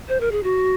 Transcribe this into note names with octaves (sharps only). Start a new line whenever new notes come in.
C5
A#4
G#4
F#4